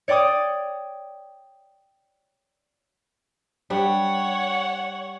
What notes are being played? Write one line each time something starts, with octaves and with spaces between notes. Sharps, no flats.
C#5 D5 G5 D6 D#6
G3 D4 C#5 F#5